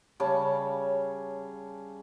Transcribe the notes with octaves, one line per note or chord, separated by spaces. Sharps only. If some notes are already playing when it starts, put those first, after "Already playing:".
C#3 G3 C#4 A5